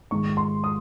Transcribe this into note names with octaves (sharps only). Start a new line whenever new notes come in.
G#2 D#3 G#3 D#4 C#6
C6
D#6